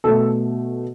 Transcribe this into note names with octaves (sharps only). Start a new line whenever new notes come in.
B2 A3 A4